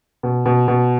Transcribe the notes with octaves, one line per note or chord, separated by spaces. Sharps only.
B2
B2
B2